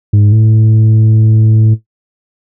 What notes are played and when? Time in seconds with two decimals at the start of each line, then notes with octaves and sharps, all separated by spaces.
0.13 G#2
0.32 A2